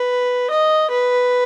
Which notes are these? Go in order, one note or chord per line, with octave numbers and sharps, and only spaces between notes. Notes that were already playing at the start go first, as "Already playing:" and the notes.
Already playing: B4
D#5
B4